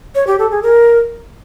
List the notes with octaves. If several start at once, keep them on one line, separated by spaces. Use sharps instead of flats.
C#5
G4
A4
G#4
A#4